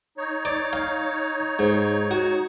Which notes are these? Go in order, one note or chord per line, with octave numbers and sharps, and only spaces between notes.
D#4 C#5
D5
F5
G#2
F#4